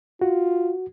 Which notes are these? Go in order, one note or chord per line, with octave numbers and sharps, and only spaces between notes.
F4 F#4